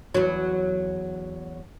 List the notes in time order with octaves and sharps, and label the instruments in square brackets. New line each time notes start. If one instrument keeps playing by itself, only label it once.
[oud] E2 F#3